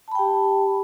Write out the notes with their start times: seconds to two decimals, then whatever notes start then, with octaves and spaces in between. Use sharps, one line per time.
0.08 A5
0.11 B5
0.15 G5
0.19 G4